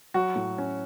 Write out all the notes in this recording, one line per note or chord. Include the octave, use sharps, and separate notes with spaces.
F#3 F#4
A2
C#4